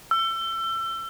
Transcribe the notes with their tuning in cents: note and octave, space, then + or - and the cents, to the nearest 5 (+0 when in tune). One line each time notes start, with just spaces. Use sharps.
E6 +30